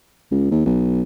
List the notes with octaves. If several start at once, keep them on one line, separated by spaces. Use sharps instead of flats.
C#2
D#2
B1